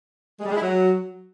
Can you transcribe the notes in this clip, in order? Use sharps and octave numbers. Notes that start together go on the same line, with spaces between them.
G#3
G3
G#3
E4
F#3